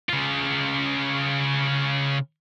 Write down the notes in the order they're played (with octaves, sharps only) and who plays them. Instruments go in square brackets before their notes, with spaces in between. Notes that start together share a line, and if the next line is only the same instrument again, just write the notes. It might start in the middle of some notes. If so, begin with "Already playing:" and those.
[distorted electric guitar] C#3 F4